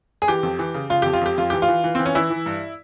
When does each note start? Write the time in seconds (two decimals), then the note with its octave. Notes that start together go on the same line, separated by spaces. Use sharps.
0.22 G#4
0.28 E3 G4
0.43 F2
0.59 E3
0.74 C#3
0.90 C#3 F4
1.02 F2 G4
1.13 F4
1.21 F2 G4
1.37 F2 F4
1.50 E3 G4
1.62 F4
1.68 E3
1.84 E3
1.95 E3 C4
2.06 C#4
2.15 E3 E4
2.30 E3
2.46 G2